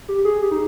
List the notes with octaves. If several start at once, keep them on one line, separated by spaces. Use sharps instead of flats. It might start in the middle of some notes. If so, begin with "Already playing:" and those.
G4
G#4
G4
D#4